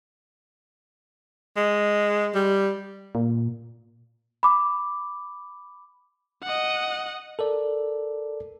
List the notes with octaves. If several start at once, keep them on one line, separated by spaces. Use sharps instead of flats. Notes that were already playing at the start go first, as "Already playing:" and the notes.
G#3
G3
A#2
B5 D6
D#5 F#5
A4 A#4 D5